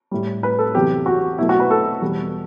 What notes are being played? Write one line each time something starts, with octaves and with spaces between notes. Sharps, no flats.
A2 G3
B4
A4
E2 C3 F#3 G4
F#4
B2 F#3 A3 E4
F#4
B4
A4
E2 B2 G3